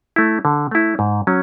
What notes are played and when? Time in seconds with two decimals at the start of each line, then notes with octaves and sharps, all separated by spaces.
0.16 A3 E4
0.45 D3
0.71 A3 E4
0.99 G#2
1.27 F#3 C#4